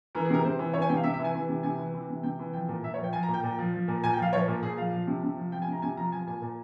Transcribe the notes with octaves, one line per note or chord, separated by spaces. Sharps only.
E3 A#4
G#4
C3 A#4
C3 C5
E3
E3 C#5
G#5
C3 G5
F5
C3 E5
E5
E3
G#5
E3
C3
C3 G#5
E3
E3
C3
C3 G5
E3
F3 G5
A#2
A#2 E5
C#5
F3
G5
F3 G#5
A#5
A#2
G5
A#2
F3
F3
A#2
A#2 G#5
G5
F3 F5
F3 C#5
A#2
A#2 G#4
F3 F5
F3
C3
C3
F3
F3 G5
G#5
C3 A#5
C3 G#5
F3 A#5
F3 G#5
A#2 G#5
A#2